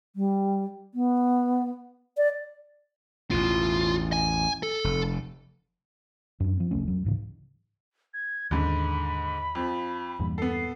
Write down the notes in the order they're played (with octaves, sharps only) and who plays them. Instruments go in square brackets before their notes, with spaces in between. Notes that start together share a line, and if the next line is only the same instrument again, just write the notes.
[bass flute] G3
B3
D5
[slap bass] A1 E2 B2 [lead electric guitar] F4
[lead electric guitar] G#5
A4
[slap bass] F1
[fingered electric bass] F#2 D4
F3 C4
F1 C2 A3 C#4
F2 F#3
C2 G#2 C#3 E3
[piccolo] G#6
[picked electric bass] D#2 D#3 C#4 [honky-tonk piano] G#2 D3 [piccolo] B5
[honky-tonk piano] F2 F3
[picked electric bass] E2 G2 A#2
[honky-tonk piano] B3 A4 [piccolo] C7